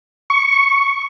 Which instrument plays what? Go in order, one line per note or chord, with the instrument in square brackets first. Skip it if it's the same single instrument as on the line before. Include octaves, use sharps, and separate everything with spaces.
[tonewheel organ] C#6